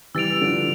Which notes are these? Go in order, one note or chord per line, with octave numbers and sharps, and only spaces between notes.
E3 G3 E6 A6 D7 F7
D3 F3